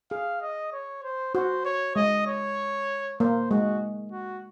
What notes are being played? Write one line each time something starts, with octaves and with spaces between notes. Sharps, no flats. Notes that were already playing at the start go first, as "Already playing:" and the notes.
G#4 F5
D#5
C#5
C5
F#4 C5
C#5
G#3 D#5
C#5
A#3 C5
G#3 F#4
F#4